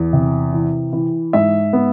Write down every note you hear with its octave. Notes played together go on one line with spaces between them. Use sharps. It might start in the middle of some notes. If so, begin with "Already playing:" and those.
Already playing: E2
C3
E3
E3
G#2 E5
B3